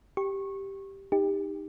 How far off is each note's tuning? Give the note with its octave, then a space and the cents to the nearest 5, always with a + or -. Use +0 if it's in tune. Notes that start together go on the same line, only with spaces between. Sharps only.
G4 +0 C#6 -20
D#4 +0 G4 +25